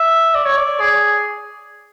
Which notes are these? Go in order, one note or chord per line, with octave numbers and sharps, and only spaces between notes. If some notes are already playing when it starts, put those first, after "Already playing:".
Already playing: E5
D5
C#5
D5
G#4